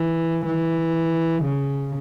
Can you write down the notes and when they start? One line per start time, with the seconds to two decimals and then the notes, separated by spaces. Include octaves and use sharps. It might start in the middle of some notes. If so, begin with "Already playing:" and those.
Already playing: E3
0.47 E3
1.45 C#3